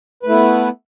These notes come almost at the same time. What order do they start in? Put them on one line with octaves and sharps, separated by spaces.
B4 A3 E4 B3